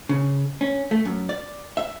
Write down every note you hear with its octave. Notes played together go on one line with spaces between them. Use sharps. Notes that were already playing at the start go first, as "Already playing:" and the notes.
C#3
C#4
A3
F#2
D5
E5